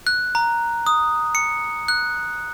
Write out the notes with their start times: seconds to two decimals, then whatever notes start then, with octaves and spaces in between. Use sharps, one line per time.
0.07 F#6
0.35 A#5
0.86 D#6
1.35 C#7
1.88 F#6